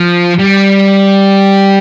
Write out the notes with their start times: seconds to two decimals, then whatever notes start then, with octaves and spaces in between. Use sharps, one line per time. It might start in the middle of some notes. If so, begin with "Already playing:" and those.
Already playing: F3
0.38 G3